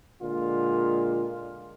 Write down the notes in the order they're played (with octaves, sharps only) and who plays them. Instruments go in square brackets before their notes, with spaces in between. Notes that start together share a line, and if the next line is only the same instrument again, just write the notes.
[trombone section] A#2 D3 G#3 F4